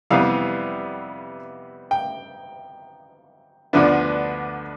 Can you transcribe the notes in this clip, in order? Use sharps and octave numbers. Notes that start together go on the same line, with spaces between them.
F2 C3 E3 G3 B3 F5
G5
D2 D3 F3 B3 D4